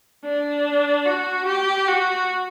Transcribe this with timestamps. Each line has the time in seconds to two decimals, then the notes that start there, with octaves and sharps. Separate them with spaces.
0.24 D4
1.06 F#4
1.46 G4
1.88 F#4